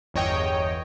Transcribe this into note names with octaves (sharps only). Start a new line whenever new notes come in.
G1 E2 C#5 D#5 G5